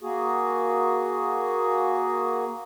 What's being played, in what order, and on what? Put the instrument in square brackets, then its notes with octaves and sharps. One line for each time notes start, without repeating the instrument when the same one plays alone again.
[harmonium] A#3 F#4 G#4